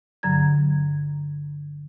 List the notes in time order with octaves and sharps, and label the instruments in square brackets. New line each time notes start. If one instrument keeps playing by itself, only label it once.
[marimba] G2 D3 F#3 A#5 G#6